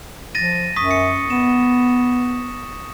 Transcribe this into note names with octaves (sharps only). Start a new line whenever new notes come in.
F3 A6 A#6 D#7
F#2 C#6 D#6 B6
C#7
B3 E7